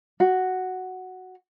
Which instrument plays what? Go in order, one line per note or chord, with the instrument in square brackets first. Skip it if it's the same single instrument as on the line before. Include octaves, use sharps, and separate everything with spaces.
[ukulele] F#4